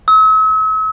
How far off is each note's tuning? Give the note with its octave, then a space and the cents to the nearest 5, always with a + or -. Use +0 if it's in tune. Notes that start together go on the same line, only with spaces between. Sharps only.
E6 -45